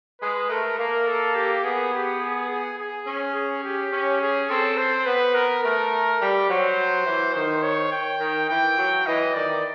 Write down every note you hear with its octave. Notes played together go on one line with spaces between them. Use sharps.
G#3 B4
A3 A#4
A#3 A#4
A4
G4
B3 G#4
G4
G#4
G#4
G#4
C#4
G#4
G4
C#4
G#4
C4 A4
C5
B3 B4
A#4
A3 A#4
G3
F#3 C5
E3
D#3 C5
C#5
G5
D#3
E3 G5
F#3
E3 D#5
D#3 D5